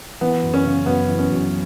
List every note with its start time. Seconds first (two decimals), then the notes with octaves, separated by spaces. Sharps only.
0.21 E3 B3
0.43 F#2
0.54 C#4
0.65 C#3
0.86 F#2 B3
1.08 E3
1.18 C#4
1.30 F#2